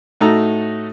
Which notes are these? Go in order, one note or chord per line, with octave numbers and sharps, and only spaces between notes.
A2 A3 D#4 F#4 A4 A#5